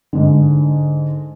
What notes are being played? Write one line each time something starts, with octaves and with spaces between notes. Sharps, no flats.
G#2 D3